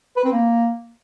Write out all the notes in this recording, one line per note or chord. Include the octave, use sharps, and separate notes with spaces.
B4
C4
A#3